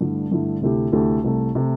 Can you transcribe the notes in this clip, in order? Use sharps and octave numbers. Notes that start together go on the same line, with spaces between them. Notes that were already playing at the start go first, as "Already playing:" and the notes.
G2 D3 A3 E4
G2 D3 A3 E4
D2 C3 A3 E4 G4
D2 C3 A3 E4 G4
C2 C3 A3
C3 A3